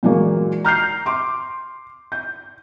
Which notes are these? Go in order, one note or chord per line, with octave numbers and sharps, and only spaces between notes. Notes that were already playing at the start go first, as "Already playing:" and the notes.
A#2 E3 F#3 G#3 A#3
A#5 F6 G6 C7
C6 D6
G6